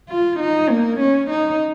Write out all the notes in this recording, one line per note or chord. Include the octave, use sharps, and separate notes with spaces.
F4
D#4
A#3
C#4
D#4